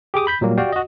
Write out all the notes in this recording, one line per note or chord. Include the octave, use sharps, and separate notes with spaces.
G4 G#4 D6 D#6
B5 G6 B6
A#2 F#3 G3 A#3
F#4 G4 D5 F5 G5
F#4 D#5